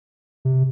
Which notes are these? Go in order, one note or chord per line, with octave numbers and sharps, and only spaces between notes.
C3